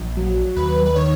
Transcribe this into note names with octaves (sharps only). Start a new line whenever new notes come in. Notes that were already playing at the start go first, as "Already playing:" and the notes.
Already playing: A#1
F#3
D#2 B4
B4
D#3 C#5